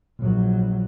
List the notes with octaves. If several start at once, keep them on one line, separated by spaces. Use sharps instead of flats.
A#1 F#3